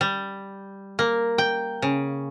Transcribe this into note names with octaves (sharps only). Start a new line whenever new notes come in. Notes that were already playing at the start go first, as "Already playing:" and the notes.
G3
A#3
G5
C#3